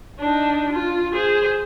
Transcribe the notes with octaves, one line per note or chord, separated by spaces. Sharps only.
D4 D#4
F4
G#4 C5